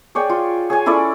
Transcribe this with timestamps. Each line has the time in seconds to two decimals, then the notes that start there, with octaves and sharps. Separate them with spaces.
0.15 G#4 C#5 D5 G5
0.29 F4
0.70 G#4 C#5 G#5
0.86 C#4 E4 A4 D5